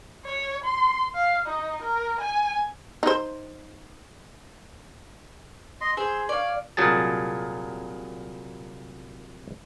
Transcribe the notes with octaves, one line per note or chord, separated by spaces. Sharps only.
C#5
C6
F5
D#4
A#4
G#5
D#4 C5
D#5 C6
G#4 C5 E6
C#5 D5 F5
C2 A#2 F#3 G#4 A5